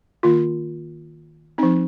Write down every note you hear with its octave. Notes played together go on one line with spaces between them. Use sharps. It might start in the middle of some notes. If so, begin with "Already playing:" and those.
D#3 A#3 F4
F3 C4 D#4